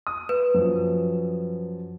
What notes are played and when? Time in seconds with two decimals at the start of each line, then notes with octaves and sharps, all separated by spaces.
0.07 D#6
0.29 B4
0.54 F#2 F3